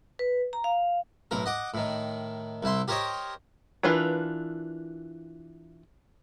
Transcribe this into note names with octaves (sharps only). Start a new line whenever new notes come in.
B4
A#5
F5
B1 A2 A#4
D#5 F#5 D6
A2 D#3
C2 E4 C6
G4 A#4 C5 C#5 D#5
E3 D4 F4 A#4 B4